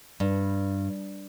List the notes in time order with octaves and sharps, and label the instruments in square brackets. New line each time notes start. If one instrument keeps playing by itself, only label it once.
[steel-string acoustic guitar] G2